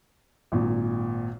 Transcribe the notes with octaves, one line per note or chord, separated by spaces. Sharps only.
G#1 A#2